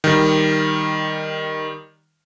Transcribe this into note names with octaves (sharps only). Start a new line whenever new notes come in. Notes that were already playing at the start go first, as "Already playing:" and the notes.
D#3 G3